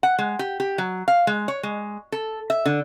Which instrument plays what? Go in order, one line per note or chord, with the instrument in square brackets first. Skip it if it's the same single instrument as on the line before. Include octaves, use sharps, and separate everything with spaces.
[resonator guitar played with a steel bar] F#5
G#3
G4
G4
F#3
F5
G#3
C#5
G#3
A4
E5
D3